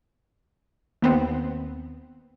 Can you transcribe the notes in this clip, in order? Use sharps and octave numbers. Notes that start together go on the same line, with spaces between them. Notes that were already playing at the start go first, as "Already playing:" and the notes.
D#2 B3 C4